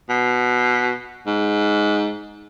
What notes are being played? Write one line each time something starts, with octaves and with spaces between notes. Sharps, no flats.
B2
G#2